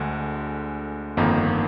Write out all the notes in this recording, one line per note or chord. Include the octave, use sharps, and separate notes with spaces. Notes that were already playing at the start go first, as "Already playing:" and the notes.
Already playing: D2 D3 G#3
G1 F2 D#3 A#3 D#4